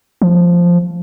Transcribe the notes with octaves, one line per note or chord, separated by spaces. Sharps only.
F3